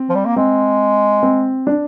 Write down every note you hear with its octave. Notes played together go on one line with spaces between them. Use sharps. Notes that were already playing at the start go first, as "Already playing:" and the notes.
Already playing: C4
F3
G3
A#3
G#3 C4
C4
D4